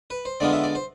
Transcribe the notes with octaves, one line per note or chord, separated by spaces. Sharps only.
B4
C5
D3 G#3 B3 D4 F4 D5
E5
D5
C5